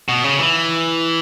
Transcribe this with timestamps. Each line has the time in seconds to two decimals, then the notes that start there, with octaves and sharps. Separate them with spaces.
0.09 B2
0.24 C#3
0.39 E3